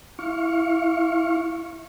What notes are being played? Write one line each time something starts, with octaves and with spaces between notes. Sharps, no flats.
E4 F5 C#6